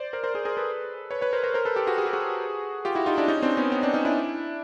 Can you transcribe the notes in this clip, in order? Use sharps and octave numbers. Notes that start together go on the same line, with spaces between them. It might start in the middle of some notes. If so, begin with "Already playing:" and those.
Already playing: C5 D5
A#4 C5
A#4 C5
G#4 A#4
G#4 A#4
A4 B4
B4 C#5
B4 C#5
A#4 C5
A#4 C5
A#4 C5
A4 B4
G4 A4
F#4 G#4
G#4
G4
F#4 G#4
F4 G4
E4 F#4
D#4 F4
D4 E4
C#4 D#4
C4 D4
B3 C#4
B3 C#4
C4 D4
C#4 D#4
D4 E4